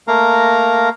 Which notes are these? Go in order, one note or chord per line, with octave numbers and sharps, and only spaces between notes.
A3 A#3 A#4 F5 A#5